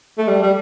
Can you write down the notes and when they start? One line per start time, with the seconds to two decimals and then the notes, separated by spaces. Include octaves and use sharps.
0.18 A3
0.28 G3
0.42 G3